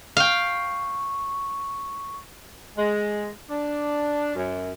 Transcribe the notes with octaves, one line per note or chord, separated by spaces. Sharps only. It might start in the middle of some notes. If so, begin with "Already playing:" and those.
F5 G5 C#6
G#3
D4
F#2